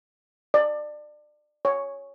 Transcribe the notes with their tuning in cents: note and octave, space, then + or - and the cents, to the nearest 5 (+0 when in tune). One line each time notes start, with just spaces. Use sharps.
D5 +25
C#5 +5